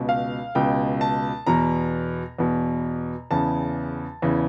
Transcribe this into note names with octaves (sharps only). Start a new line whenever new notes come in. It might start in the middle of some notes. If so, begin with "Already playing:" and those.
Already playing: C#2 B2
F5
C#2 B2 G5
A5
E2 B2 A#5
E2 B2
E2 C#3 E3 A5
E2 C#3 E3